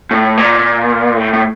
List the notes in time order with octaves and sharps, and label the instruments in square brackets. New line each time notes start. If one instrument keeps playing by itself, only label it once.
[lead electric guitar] A2
A#2
A2
A2